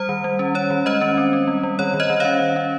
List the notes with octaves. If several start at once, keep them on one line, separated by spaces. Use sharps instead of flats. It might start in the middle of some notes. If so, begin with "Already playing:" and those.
Already playing: G3 C5
D#3
G3
C#4
C#4 C#5
D#3
G#3 C5 D#5
C#4
C4
C4
G3
G3
D#3 C#5
D#3
C5 D#5
D#3
C#4 C#5 F5
C#4
C#4